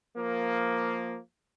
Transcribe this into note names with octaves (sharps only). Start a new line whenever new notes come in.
F3 A#3